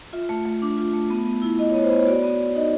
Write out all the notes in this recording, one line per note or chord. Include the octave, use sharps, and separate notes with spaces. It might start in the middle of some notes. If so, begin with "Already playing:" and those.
F4 E5
A3
A3
D4
F4
A3
B3
B3
E4
E4 D#5
B3 C#5
C5
B3 C#5
F#4 D5
B3
B3
D#4 D#5